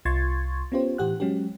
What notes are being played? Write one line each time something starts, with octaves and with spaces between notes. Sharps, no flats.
C2 F4 C6 C#6 G#6 A6
B3 C#4 F4 G4 C5
A2 E3 G4 F#5 F#6
F#3 G#3 C#4 F#4 G4